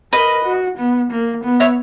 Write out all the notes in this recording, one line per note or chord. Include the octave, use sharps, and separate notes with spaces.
A#4 B4 D#5
F#4
B3
A#3
B3
C#5 E5